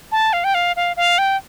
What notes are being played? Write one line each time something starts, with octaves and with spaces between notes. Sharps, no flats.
A5
F5
G5
F5
F5
F5
G5